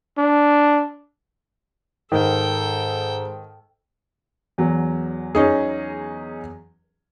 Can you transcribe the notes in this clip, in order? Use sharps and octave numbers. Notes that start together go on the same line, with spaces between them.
D4
G#2 D#3 A4 G5
E2 F#3
C#4 D#4 G#4